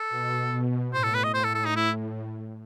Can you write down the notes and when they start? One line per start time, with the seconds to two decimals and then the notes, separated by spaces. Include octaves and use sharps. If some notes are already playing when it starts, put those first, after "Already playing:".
Already playing: A4
0.10 B2
0.52 B2
0.93 A2 C5
1.04 A4
1.14 B4
1.24 D#5
1.34 A2 C5
1.44 A4
1.55 A4
1.65 D#4
1.76 E4